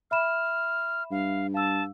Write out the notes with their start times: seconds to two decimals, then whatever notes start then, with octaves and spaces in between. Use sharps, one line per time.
0.11 E5 B5 F6 E7
1.11 G2 F5
1.54 F5 A5 E6